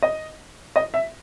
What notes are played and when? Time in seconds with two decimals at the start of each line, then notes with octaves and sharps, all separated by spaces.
0.02 D#5
0.76 D#5
0.94 E5